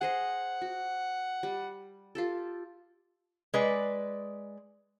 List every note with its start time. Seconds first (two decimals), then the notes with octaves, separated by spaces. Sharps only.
0.01 G#4 C5 D#5 F#5
0.61 F#4
1.43 G3
2.15 F4 G4 A4
3.54 G#3 B4 D5